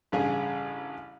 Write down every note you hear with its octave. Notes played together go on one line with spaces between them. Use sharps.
A1 G2 C#3 G#4 G#5